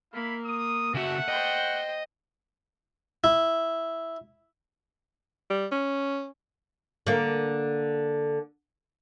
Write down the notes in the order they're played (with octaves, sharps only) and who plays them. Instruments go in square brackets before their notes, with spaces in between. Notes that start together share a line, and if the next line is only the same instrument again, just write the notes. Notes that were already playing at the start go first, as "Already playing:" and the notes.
[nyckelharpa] A#3 [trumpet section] E4 F5 B5
[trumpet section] D#6
[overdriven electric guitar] C#3 F#4 [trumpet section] A3 F#5 [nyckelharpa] E5
[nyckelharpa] C5 G5 [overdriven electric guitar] D#5
[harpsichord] E4
[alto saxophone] G3
C#4
[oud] D3 A#3